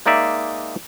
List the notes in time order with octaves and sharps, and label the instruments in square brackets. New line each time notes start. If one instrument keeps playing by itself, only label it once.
[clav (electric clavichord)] G#3 A#3 D#4 D5 E5